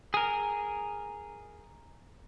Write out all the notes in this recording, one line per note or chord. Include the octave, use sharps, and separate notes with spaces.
G#4 A#4